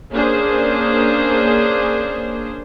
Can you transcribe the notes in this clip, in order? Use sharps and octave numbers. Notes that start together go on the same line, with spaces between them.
A#3 C#4 D4 G#4 C5